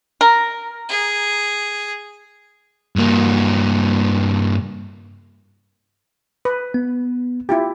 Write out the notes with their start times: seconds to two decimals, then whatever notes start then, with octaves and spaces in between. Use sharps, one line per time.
0.21 A#4
0.89 G#4
2.96 G2 A#3
6.45 B4
6.74 B3
7.49 E4 F4 G4